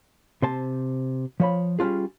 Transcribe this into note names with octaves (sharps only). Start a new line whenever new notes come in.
C3 C5 A5
F3 C#5 B5
G3 C#4 D4 F4 G#4